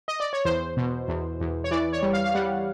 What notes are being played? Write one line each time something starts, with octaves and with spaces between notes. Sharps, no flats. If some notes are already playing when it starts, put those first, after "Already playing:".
D#5
D5
C#5
E2 C5
B2
E2
E2
C#5
E3 D5
C#5
G3
F5
F5
G3 F#5